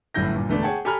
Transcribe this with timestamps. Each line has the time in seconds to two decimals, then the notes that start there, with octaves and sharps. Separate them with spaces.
0.14 G1 F#2 A2 E4 G6 A#6
0.35 G2 A#2
0.49 E1 D3 A3 B3 D4
0.62 G#4 C#5 F#5 G5 A5
0.85 G4 A4 G#5 A#5 B5 F6